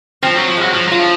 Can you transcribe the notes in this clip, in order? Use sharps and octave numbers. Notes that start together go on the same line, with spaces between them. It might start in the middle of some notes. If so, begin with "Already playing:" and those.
F3 C4
F#3
F3
F#3 G#3
F3
F#3 F4
F3